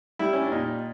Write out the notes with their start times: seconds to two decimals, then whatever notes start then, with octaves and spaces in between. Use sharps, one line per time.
0.19 G3 E4
0.33 C#4
0.42 D4
0.52 A#2 D#4